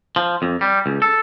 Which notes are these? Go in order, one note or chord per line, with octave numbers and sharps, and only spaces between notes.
F3
F2
G3
C#2
A4